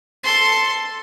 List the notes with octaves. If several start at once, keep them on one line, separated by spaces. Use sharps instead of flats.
A4 C6